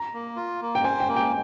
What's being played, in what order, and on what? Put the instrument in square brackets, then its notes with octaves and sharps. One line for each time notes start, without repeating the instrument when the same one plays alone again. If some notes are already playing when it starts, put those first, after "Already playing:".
Already playing: [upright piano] A#5
[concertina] A#3
F4
A#3
[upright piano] G5
[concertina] C5 [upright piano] G#5
[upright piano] G5
[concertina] A#3
[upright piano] G5